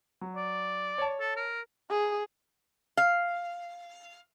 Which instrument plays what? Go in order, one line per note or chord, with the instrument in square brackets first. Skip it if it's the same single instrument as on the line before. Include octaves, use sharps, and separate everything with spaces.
[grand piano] F#3
[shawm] D5
[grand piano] C#5 A5
[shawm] A4
A#4
[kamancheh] G#4
[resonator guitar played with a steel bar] F5